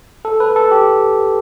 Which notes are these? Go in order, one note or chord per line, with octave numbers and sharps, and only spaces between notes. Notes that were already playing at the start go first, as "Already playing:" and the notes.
A4
B4
A4
G4